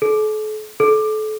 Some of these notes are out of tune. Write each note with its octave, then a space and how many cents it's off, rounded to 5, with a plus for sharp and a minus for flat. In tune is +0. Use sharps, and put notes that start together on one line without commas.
A4 -40
A4 -30